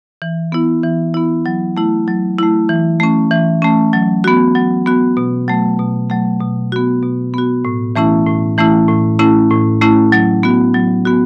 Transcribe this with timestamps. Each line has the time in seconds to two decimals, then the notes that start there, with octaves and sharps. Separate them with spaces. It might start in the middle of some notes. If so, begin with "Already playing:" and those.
0.22 E3
0.52 B3 E4
0.83 E3
1.14 B3 E4
1.46 F#3
1.77 A3 E4
2.07 F#3
2.39 A3 E4
2.69 E3
3.00 A3 C#4
3.31 E3
3.62 A3 C#4
3.93 F#3
4.24 B3 F#4
4.55 F#3
4.86 B3 F#4
5.17 B2
5.48 F#3 A3
5.79 B2
6.10 F#3 A3
6.41 B2
6.72 B3 F#4
7.03 B2
7.34 B3 F#4
7.65 A2
7.96 E3 A3 C#4 E4
8.27 A2
8.58 E3 A3 C#4 E4
8.88 A2
9.19 A3 C#4 E4
9.50 A2
9.81 A3 C#4 E4
10.12 F#3
10.43 B3 F#4
10.74 F#3
11.05 B3 F#4